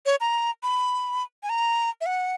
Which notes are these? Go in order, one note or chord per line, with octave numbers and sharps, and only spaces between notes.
C#5
A#5
B5
G#5
A#5
E5
F#5